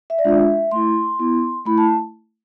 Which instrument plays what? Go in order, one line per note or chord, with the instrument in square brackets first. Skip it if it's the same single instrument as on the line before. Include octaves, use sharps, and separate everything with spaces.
[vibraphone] E5
D5
G#3 D4 F4 E5
A3 E4 C6
B3 E4
A3 E4 B5
A5